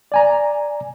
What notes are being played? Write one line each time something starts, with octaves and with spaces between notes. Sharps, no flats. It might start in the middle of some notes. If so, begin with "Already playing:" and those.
D5 G#5 A#5